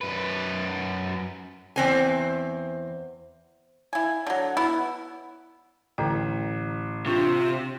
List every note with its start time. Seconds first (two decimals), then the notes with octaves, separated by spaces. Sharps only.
0.01 F#2 B4
1.76 E2 C4 G#5
3.93 E4 G#5
4.27 D3 F#3
4.57 B3 E4
5.98 A1 D3 G5
7.06 C3 D4 F4 C#6